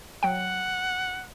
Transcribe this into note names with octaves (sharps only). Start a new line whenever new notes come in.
F#3 F#5 G5